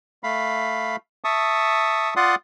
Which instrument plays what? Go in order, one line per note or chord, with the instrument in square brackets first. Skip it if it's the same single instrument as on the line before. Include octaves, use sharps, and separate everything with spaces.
[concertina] A3 F5 B5
E5 A5 C#6 D#6
F4 D5 F#5 C6 D#6